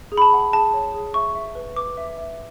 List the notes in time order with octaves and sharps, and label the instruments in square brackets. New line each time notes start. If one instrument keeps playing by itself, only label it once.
[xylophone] G#4
B5
A5
F#5
G#4 A5
C#5
G#4
E5 C#6
E5
B4
B4 D6
E5
E5